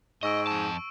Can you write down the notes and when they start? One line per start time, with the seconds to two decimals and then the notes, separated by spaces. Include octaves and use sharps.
0.23 G#2 D#5 C#6 E6 D7
0.47 F2 A5